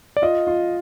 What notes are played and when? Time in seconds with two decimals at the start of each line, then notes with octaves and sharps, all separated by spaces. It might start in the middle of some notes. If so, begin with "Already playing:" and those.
0.17 D5
0.22 F4 D#5
0.47 F4